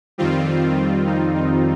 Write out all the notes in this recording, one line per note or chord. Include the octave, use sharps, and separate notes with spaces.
F2 D#3 G3 C4 F4
D#4
D#4